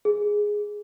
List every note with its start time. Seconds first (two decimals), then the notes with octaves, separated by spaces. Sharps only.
0.05 G#4